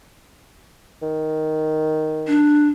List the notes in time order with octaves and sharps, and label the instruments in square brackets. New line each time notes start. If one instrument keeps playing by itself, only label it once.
[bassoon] D#3
[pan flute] D4